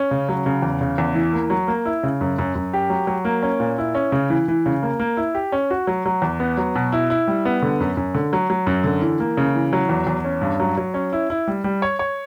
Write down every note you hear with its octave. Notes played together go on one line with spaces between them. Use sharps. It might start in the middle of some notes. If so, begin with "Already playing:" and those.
Already playing: C#4
C#3
F#3
C#3
E2
C#3
E2
E3
A#3
F#3
A#3
E4
C#3
F#2
F#2
F#2
G4
F#3
F#3
A#3
C#4
A#2
E4
C#4
C#3
E3
E3
C#3
A#3
A#3
E4
G4
C#4
F#4
F#3
F#3
E2
B3
F#3
B2
E4
E4
G3
B3
D3
F#2
F#2
D3
F#3
F#3
F#2
D3
E3
A#3
C#3
E3
F#3
E2
E2
C#4
G2
F#3
F#3
C#4
E4
E4
G3
G3
C#5
C#5